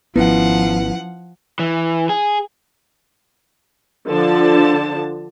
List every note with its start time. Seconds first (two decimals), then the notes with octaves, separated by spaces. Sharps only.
0.16 G#1 F3 B3 C#4 E4 B4 F#5
1.59 E3
2.09 G#4
4.08 D3 F3 A5